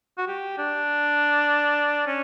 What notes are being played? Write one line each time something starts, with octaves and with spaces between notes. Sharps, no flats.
F#4
G4
D4
C#4